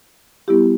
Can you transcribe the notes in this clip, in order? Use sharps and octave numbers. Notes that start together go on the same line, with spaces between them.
G3 B3 E4 G4